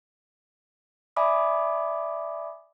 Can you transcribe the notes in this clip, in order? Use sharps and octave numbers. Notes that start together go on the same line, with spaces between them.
D5 E5 G#5 B5 D6 D#6